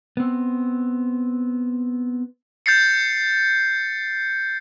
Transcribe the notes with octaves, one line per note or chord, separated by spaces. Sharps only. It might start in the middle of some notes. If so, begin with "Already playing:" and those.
B3 C4
G6 A6 C7 C#7